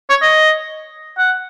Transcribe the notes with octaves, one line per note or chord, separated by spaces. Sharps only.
C#5
D#5
F#5